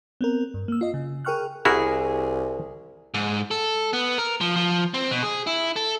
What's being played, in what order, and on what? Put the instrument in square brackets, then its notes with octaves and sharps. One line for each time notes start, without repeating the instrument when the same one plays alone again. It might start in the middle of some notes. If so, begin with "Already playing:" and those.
[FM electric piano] B3 C4 A#4
G2
A#3 E6
F4 D#5
C#3
G#4 A#4 G5 C#6 F6 F#6
[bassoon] C2 [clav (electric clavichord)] E4 F#4 A#4 [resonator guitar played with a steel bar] G#4
[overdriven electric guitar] G#2
A4
B3
A#4
F3
F3
C4
B2
G#4
E4
A4